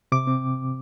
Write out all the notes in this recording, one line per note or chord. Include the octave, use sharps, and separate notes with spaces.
C3 D6
C4